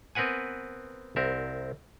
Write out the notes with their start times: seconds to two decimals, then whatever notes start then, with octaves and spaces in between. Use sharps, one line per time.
0.15 B3 C4 A#4 B4 F#5 G#5
1.16 C2 C4 A#4 E5